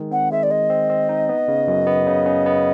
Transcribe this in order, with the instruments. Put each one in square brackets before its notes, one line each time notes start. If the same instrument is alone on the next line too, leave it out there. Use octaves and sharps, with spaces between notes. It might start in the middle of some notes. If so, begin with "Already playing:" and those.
Already playing: [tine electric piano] D#3 G#3
[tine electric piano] C4 [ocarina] F#5
[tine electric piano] G#3 [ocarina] E5
[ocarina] D5
[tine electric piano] G#3 [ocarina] D#5
[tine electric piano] C4
C4
D#4
B3
C#3
F#2
B3
C#3
C#3
B3